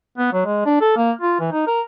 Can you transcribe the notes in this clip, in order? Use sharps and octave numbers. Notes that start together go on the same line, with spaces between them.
B3
F#3
G#3
D4
A4
A#3
F4
E3
D#4
A#4